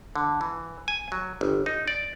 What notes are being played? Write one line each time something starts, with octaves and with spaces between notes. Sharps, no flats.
D3
E3
G#5
F#3
G1
D#4
D5